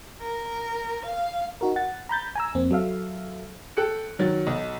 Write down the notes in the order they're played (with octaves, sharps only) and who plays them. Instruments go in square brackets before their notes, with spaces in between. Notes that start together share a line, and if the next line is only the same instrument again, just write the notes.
[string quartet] A#4
F5
[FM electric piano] D#4 F#4 A#4
F#5 A6
A#5 B5 G6 A6
G#5 A#5 E6
F2 A#3 C4
F#3 A4 E5 F5
[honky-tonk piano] A4 G5 F#6 C#7
D#3 F#3 A6
B1 D#5